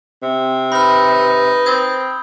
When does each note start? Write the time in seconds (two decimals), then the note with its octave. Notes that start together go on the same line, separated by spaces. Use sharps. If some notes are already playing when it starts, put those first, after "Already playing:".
0.22 C3 C4
0.72 D#4 B4 B5 F6
1.66 C4 D#6 G6 G#6